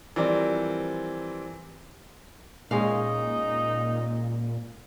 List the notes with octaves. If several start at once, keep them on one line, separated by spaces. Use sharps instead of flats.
E3 F3 G3 C4 A#4 D5
A#2 G#3 C#4 D#4 F5